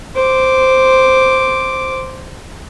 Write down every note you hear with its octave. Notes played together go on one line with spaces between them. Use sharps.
C5 D6